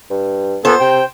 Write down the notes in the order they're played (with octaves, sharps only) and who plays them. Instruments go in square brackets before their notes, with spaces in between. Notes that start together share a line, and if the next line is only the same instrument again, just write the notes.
[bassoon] G2
[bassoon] A#2 [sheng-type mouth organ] B3 A4 [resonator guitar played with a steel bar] C5
[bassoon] C3 [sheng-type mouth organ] G5